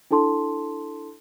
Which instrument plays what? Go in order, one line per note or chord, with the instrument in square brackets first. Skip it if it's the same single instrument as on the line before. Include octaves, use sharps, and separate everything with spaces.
[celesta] D4 E4 A4 A5 C6